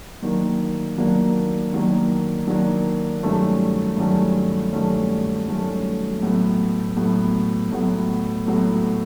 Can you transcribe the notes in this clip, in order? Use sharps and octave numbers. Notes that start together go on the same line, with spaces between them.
D#3 F#3 A#3 D4
D#3 F#3 A#3 D4
D#3 F#3 A#3 D4
D#3 F#3 A#3 D4
G2 D#3 F#3 A3 C#4
G2 D#3 F#3 A3 C#4
G2 D#3 F#3 A3 C#4
G2 D#3 F#3 A3 C#4
A2 F#3 B3
A2 F#3 B3
A2 F#3 B3
A2 F#3 B3